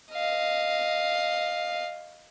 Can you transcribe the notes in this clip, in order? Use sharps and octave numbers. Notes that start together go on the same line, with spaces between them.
D#5 F5